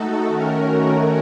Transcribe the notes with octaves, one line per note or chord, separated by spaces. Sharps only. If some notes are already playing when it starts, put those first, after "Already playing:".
Already playing: A3 D#4 F#4 A4
D#3 A3 C#4 F#4 A#4